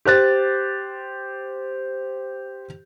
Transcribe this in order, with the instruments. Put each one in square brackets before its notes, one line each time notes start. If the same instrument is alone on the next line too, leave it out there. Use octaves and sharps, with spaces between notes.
[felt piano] G4 C5 F#6 A6